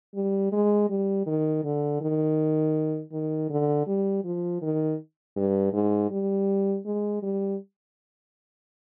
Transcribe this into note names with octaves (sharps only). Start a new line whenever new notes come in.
G3
G#3
G3
D#3
D3
D#3
D#3
D3
G3
F3
D#3
G2
G#2
G3
G#3
G3